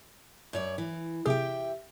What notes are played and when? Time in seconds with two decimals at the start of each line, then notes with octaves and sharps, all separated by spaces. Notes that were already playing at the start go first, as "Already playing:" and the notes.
0.53 F#2 C#5 D5
0.78 E3
1.26 C3 G4 G#4 E5 G5